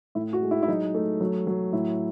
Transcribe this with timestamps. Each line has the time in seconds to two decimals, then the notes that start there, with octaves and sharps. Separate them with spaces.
0.15 A2 E4
0.33 F#4
0.42 G#3
0.51 E4
0.63 E4
0.68 F#3 D#4
0.94 A3
1.21 F#3
1.47 F#3
1.73 A2 E4